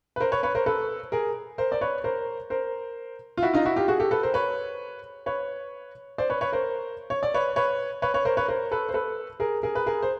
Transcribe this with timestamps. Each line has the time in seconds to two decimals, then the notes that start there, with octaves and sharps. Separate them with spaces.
0.16 B4
0.20 A#4 C5
0.32 B4 C#5
0.43 B4 C#5
0.55 A#4 C5
0.66 A4 B4
1.12 G#4 A#4
1.58 A#4 C5
1.72 D5
1.81 B4 C#5
2.04 A#4 C5
2.50 A#4 C5
3.37 F4
3.42 E4 F#4
3.53 D#4 F4
3.65 E4 F#4
3.76 F4 G4
3.88 F#4 G#4
4.00 G4 A4
4.11 A4 B4
4.23 A#4 C5
4.34 B4 C#5
5.26 B4 C#5
6.18 C5 D5
6.30 B4 C#5
6.41 B4 C#5
6.53 A#4 C5
7.10 C#5
7.23 D5
7.34 B4 C#5
7.56 B4 C#5
8.02 B4 C#5
8.14 B4 C#5
8.25 A#4 C5
8.37 B4 C#5
8.48 A#4 C5
8.71 A4 B4
8.89 C5
8.94 A4 B4
9.40 G#4 A#4
9.63 G#4 A#4
9.75 B4
9.86 G#4 A#4
10.03 C5